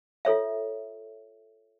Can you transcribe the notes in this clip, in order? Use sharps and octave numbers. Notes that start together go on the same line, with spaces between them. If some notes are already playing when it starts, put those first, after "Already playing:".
F4 A4 C#5 E5